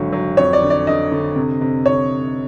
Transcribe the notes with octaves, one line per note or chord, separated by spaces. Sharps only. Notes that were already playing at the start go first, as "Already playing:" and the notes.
Already playing: G#1 D3 F#3
F#3
F2 C#5
D5
D3
D5
D3 D#5
D3
C3
C3
C#5